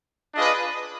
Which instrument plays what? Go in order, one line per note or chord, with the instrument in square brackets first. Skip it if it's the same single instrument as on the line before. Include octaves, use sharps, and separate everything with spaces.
[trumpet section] D4 F4 G#4 B4 D#5